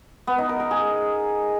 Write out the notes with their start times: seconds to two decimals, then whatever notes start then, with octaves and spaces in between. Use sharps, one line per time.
0.27 B3
0.38 D#4
0.49 A#4
0.60 A#4
0.71 G#4